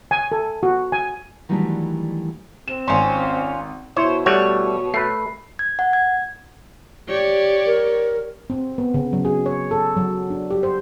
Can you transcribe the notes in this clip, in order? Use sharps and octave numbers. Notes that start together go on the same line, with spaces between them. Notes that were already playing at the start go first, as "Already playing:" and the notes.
G#5
A4
F#4
G#5
D#3 E3 F#3 G3 A3 D4
C4 E7
G#1 C#4 F4 C6
B2 E4 C5 C#5
G3 A3 C#5 F#5
A3 B4 C7
G#6
F#5
G#6
G4 C#5 D5
A#4
C4
B3
C#3
F#3
G#4
C#5
A4
F#3
D4
G4
C5